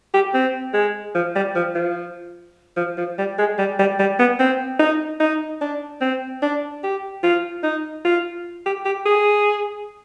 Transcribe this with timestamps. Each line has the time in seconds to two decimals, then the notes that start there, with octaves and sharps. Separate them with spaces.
0.14 G4
0.34 C4
0.74 G#3
1.15 F3
1.35 G3
1.56 F3
1.75 F3
2.77 F3
2.98 F3
3.18 G3
3.39 G#3
3.58 G3
3.79 G3
4.00 G3
4.19 B3
4.40 C4
4.79 D#4
5.20 D#4
5.61 D4
6.01 C4
6.42 D4
6.84 G4
7.23 F4
7.63 D#4
8.05 F4
8.66 G4
8.85 G4
9.06 G#4